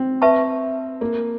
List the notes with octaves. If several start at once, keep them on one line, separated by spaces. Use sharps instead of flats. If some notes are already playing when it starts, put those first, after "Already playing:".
Already playing: C4
B4 E5 A5 C#6
A#3